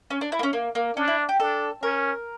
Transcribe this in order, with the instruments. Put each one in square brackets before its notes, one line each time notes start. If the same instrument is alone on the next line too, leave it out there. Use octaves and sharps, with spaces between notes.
[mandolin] C#4
D4
E4
A#3
C#4
A#3
A#3
[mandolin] C#4 [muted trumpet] D4
[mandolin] E4
G4
[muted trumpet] D4 [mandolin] A4
[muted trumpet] C#4 [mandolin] A#4